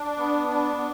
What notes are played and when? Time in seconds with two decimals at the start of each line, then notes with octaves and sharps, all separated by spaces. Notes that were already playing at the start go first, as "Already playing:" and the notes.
Already playing: D4
0.19 B3
0.47 D4
0.77 B3